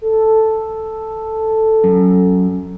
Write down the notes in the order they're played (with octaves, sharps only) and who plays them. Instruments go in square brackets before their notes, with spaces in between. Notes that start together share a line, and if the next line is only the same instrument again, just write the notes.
[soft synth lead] A4
[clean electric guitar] F#2